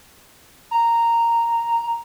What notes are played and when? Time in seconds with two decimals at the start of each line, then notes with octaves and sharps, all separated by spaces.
0.71 A#5